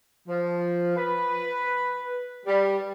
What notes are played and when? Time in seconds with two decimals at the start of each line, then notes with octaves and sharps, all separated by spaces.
0.28 F3
0.97 B4
2.46 G3